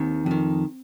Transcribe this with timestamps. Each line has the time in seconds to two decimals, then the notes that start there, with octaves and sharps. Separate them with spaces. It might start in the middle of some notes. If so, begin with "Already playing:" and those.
Already playing: D#2 D#3 C4
0.26 F2 D#3